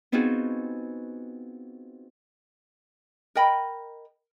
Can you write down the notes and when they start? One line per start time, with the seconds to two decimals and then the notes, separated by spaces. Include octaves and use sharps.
0.12 B3 C4 D#4 F4 F#4 G#4
3.35 A#4 D#5 G5 B5